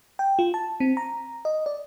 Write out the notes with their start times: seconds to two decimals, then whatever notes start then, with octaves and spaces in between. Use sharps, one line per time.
0.19 G5
0.39 F4
0.54 A5
0.80 C4
0.97 A#5
1.45 D#5
1.66 D5